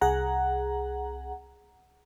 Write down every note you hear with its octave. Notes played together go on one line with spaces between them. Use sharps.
C2 G#4 F#5 A#5